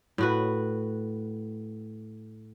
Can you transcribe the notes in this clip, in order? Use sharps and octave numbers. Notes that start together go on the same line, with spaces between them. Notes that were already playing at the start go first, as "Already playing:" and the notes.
A2 F#4 B4